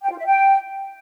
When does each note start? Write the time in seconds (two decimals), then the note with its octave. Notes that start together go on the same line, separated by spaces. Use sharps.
0.04 G5
0.11 F4
0.19 E5
0.26 G5